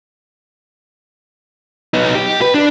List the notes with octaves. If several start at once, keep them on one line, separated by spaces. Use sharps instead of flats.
B3 D#4
G4
B4
D4